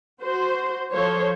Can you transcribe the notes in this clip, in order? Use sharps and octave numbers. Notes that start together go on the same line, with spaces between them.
F#4 C5
F3 A4 C5 C#5